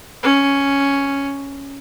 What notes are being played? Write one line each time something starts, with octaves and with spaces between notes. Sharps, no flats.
C#4